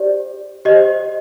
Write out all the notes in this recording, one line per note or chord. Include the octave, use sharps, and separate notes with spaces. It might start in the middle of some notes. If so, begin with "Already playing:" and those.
Already playing: G4 C5 D5
G4 C5 D#5